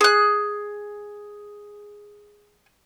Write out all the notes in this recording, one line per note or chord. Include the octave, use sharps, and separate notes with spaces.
G#4 F#6